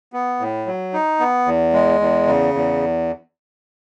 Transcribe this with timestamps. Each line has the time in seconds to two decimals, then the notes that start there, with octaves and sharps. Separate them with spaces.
0.13 B3
0.40 A2
0.66 F#3
0.93 D#4
1.20 B3
1.46 E2
1.73 G#3
2.00 E2
2.27 C#3
2.54 E2